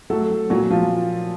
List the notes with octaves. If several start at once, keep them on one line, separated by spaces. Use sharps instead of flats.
F#3 A3 A4
F#3
A#2 F#3 F#4
F3 F4